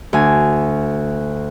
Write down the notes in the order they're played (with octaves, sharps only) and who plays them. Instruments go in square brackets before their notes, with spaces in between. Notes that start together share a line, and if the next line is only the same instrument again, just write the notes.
[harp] D2 G#5